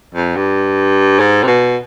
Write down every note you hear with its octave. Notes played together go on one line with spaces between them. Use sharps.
F2
G2
G#2
C3
B2